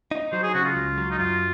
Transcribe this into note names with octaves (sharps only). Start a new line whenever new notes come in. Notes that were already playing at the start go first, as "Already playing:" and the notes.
D#4
F#3 C5
G#4
C#3 F#4
F4
C#2
F#3
D#4
F#2 F4